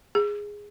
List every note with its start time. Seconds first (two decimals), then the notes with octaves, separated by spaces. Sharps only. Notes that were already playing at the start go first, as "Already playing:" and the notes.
0.15 G#4